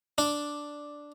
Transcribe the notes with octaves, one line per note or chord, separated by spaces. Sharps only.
D4